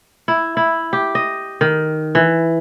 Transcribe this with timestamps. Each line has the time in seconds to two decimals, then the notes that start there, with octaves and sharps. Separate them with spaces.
0.28 E4
0.57 E4
0.93 G4
1.15 D#5
1.61 D#3
2.15 E3